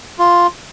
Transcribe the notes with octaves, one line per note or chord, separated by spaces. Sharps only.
F4